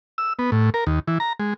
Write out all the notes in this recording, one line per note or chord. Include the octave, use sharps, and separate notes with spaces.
E6
B3
A2
A#4
D#2
E3
A#5
G#3